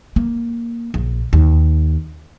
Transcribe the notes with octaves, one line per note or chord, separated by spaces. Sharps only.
A#3
A#1
D#2